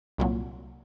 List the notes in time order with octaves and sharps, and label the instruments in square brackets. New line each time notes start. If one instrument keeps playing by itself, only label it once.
[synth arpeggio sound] C2 A#2 F#3